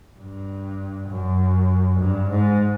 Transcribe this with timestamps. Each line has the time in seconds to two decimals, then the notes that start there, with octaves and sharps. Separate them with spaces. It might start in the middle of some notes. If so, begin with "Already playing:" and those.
0.18 G2
1.09 F#2
2.00 G2
2.30 G#2